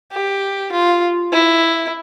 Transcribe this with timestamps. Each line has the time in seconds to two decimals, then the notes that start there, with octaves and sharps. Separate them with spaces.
0.12 G4
0.72 F4
1.32 E4